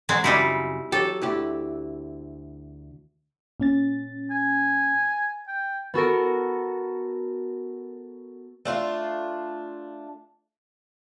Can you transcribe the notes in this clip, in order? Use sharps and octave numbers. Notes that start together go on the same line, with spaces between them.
F#3 G#3 C4
F#2 C#3 G3 D#4 E4
F#3 G4 A4
D2 E4 G4
A#2 C#4 A6
G#5
G5
B3 F#4 A4 A#4
A3 D4 F4